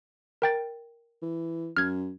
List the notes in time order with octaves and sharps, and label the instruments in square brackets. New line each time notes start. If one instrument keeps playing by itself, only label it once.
[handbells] A#4 G5 A6
[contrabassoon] E3
[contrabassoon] F#2 [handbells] F6 G#6